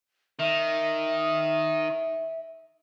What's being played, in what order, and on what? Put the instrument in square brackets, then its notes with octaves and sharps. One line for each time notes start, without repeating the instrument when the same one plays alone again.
[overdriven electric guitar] D#3 [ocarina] E5